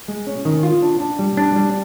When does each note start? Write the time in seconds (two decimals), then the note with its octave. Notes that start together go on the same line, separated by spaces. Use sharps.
0.08 G#3
0.27 C#4
0.45 D#3
0.63 F4
0.82 D4
1.00 D4
1.19 G3
1.37 D4
1.56 G3